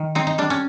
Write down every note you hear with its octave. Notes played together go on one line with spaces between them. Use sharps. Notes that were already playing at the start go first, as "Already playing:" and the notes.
Already playing: D#3
C4 D#4
D#4
G3 D4
C#4